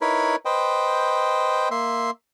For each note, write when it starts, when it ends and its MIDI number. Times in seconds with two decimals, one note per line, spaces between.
0.01 0.36 63
0.01 0.36 64
0.01 0.36 70
0.01 0.36 71
0.01 0.36 73
0.01 0.36 83
0.45 1.69 71
0.45 1.69 72
0.45 1.69 75
0.45 1.69 79
1.71 2.11 58
1.71 2.11 76
1.71 2.11 84